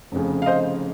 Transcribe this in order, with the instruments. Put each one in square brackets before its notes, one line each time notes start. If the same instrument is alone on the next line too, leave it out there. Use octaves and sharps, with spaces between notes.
[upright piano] F1 F2 C#3
F5
C5 D#5